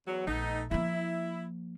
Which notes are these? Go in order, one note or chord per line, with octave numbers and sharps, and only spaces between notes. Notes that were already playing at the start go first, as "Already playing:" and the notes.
E2 F#3
A#1 A3 B3 D#4
F3 A#3 E4